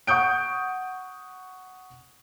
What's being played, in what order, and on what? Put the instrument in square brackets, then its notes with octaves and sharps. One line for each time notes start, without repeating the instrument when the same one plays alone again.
[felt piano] F#5 C#6 D#6 G6 D7